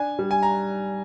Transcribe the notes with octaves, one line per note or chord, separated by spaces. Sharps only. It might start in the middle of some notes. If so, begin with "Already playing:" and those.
Already playing: D4 G#5
G3
G#5
A#5